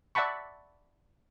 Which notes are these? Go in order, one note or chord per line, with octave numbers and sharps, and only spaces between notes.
D5 E5 F#5 A5 B5 C#6